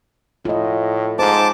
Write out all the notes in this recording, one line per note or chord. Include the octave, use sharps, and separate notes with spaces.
A2 F4 D#5
G#2 C5 A5 D6